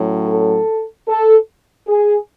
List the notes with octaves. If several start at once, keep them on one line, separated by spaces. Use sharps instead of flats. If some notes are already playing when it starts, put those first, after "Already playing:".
Already playing: A2 F#3 C#4
A4
A4
G#4